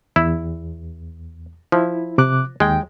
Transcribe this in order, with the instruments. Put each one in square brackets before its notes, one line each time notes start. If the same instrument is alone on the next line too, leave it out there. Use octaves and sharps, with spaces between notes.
[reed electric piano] E2 [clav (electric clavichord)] E4
[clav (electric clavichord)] F3 [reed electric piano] E4
[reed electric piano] C3 D6 F#6
[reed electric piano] D#2 G5 [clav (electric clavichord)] G#3